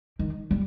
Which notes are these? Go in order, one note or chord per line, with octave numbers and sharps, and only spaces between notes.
D#3
G3